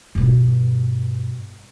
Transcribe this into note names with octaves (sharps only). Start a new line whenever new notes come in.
G2 B2